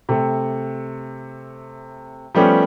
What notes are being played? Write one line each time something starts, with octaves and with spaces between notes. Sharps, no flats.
C3 A3
F3 G3 A3 B3 C#4 G4